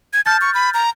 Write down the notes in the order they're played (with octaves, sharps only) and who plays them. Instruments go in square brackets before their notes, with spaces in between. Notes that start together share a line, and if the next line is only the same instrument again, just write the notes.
[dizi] G#6
[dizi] A5 [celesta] F6 G6 A6
[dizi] C#6
B5
A#5